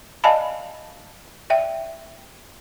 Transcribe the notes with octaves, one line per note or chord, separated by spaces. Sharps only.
D5 D#5 F5 G#5 A5 B5
D5 E5 G5